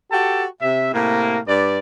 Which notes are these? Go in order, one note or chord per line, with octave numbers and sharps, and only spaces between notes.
F#4 G4 A4 G5 A5
C3 E5
A2 C3 A#3
G2 B4 D5